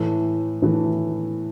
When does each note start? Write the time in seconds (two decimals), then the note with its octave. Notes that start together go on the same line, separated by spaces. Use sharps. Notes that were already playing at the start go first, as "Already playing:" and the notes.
Already playing: A2 E3 A3
0.62 A2 E3 A3